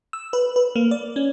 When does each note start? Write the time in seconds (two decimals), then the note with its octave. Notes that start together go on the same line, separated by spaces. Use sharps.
0.13 E6
0.33 B4
0.56 B4
0.76 A#3
0.91 D5
1.16 C#4